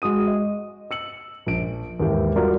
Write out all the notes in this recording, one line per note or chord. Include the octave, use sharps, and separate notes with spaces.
G#3 F#4 D#6 D#7
D#5
E6 C#7 F#7
A#1 D7
D#2 G#2 E3 G4
G3 F4 F#4 A#4 D5